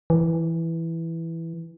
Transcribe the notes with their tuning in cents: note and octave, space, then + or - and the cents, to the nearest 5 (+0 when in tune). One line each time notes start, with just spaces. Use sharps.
E3 +0